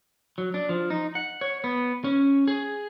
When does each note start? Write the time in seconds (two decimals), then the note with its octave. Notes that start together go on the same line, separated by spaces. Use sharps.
0.38 F#3
0.54 D4
0.69 F3
0.90 D#4
1.15 F#5
1.41 C#5
1.64 B3
2.04 C#4
2.48 G#4